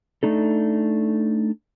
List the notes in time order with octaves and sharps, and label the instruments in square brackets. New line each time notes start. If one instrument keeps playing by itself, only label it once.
[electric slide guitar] A3 D4 D#4 A4